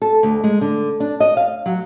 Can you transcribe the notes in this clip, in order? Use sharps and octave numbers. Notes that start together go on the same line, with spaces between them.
A4
D2
G#3
D3
D4
D#5
F5
F#3